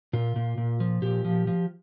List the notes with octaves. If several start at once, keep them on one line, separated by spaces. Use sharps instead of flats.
A#2 F4
A#2
A#2
F3
A#2 G4
F3
F3